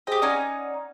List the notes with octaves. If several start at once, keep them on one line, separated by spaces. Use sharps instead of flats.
G4 G#4 C5 D#5 G5
C#4 D#4 D5 F#5 G#5